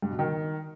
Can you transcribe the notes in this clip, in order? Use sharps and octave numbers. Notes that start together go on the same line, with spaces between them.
G2
B2
D#3